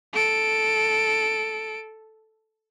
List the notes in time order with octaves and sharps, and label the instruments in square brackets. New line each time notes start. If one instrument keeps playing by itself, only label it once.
[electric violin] A4 D7